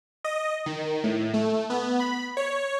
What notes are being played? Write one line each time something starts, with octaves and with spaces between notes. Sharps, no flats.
D#5
D#3
A2
A3
B3
B5
C#5